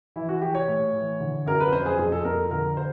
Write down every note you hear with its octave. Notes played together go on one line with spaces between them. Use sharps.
E3 E4
F#4
E3 G4
C#5
A2
E3
D3
F#2 A#4
B4
F2 C5
G#4
F2 G#4
A4
F2 A#4
D3 A#4
C5